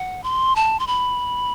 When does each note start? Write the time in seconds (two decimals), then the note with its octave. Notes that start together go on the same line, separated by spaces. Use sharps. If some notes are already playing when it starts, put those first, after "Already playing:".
Already playing: F#5
0.24 C6
0.56 A5
0.79 C6
0.87 B5